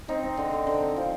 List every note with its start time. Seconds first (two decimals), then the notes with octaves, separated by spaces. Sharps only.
0.08 C4 D#4
0.23 C4
0.37 D3
0.52 D3
0.67 D3
0.82 C4
0.96 F3